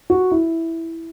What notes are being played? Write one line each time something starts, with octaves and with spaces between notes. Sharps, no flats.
F#4
E4